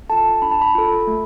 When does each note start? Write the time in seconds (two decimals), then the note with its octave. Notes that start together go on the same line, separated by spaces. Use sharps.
0.10 F4 A4 A5
0.42 D4 B5
0.51 A5
0.62 B5
0.75 F4 A4
1.07 A3